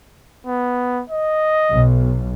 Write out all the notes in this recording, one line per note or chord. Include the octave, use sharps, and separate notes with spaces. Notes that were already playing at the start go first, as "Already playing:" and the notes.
B3
D#5
B1